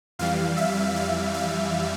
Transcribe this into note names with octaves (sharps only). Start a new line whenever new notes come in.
F2 E3 G3 F5
E5
F5
F5